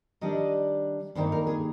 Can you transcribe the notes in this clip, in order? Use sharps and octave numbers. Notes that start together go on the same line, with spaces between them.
D#3 G3 D4 D#5
G2 D#3 A#3 D#4 C5
A#4
G#4